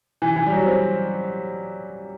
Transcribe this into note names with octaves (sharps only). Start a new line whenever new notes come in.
E3
E3
G3
F#3
C4